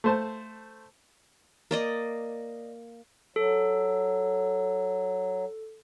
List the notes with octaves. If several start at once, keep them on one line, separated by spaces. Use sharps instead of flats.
A3 C5 A5
A#3 D5 D#5
F#3 A4